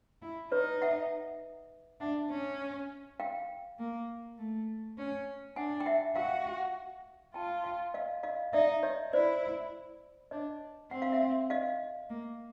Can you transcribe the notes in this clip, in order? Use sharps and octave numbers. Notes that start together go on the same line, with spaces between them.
E4
D#4 B4 C#5
E5 F#5
D4 E5 F#5
C#4
F5 G5
A#3
A3
C#4
D4 F#5 G#5
G5
E5 F#5
F#4 F5 G5
F4 G5 A5
F5 G5
D#5 F5
D#5 F5
D#4 D5 E5
C#5 D#5
E4 C5 D5
D4 C#5 D#5
C4 F#5
F5
E5 F#5
D#5 F5
A#3